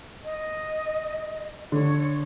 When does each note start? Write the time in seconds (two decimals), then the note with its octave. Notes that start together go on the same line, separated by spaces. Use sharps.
0.24 D#5
1.72 D3 C#5